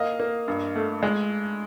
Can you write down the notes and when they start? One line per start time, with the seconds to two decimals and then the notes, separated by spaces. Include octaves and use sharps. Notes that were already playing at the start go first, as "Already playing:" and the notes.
Already playing: A#3 D#5 F5
0.20 A#3
0.48 G2
0.76 A3
1.03 G#3